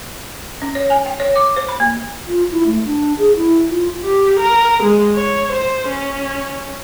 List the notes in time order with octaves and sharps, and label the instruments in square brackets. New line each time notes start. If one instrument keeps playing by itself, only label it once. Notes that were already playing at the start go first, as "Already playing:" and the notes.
[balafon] C#4
C#5
G#5
G5
C#5
D6
C5
B5
A#3
[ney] F4
E4
A3
D4
G#4
E4
F4
[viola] G4
A#4
G#3
C#5
C5
C#4